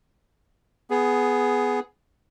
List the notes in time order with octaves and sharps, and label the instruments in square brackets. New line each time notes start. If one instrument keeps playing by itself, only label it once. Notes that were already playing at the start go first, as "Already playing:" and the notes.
[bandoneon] B3 G#4